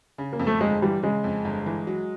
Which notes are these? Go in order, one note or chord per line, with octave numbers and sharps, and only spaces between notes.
C#3
A#3
F2
A3
G1 G#3
E3 G3
C#3 G#3
F2
G1
E3
F#3